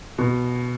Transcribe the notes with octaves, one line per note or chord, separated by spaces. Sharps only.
B2